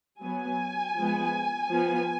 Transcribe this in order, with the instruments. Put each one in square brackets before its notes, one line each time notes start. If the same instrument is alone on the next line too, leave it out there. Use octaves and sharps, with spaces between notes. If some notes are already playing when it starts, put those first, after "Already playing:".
[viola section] F#3 B3 G#5
F3 G#3 B3
F3 B3